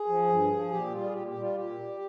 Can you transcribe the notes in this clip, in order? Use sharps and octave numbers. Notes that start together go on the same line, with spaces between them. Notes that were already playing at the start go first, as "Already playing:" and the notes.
Already playing: G#4
F3
G2
F3
A#2 G4
G3 F4
G#4
A#2 G4
G4
G3
F4
A#2 G4
G3